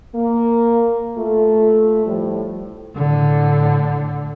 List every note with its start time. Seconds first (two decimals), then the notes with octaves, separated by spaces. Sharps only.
0.16 A#3
1.18 A3 F4 A4
2.06 A2 F3 G3
2.96 A2 D3